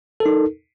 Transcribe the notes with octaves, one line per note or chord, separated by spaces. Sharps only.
D#4 A4 A#4